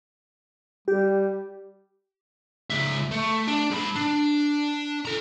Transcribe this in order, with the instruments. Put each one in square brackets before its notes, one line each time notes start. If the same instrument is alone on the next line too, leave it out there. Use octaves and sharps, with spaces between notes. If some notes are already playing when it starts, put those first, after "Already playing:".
[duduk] G3 [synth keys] G4
[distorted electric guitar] C#2 E5
A3
D4
G#2 B5
D4
A4 A#5